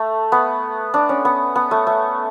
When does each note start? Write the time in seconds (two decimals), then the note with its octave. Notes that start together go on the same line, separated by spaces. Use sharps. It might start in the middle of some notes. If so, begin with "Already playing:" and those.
Already playing: A3
0.32 B3
0.94 D4
1.09 C#4
1.25 B3
1.56 B3
1.71 A3
1.87 A3